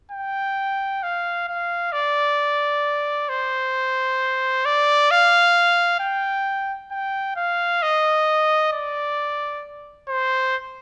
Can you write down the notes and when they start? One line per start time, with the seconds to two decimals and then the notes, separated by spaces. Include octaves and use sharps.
0.11 G5
1.03 F5
1.48 F5
1.92 D5
3.29 C5
4.65 D5
5.10 F5
6.00 G5
6.91 G5
7.36 F5
7.82 D#5
8.73 D5
10.09 C5